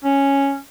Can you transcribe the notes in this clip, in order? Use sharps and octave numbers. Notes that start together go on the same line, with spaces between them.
C#4